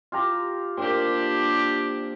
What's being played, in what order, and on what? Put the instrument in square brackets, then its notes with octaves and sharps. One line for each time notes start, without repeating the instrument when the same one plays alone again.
[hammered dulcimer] F4 G4 A#5
[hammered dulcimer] A#2 C4 [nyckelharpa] D4 G4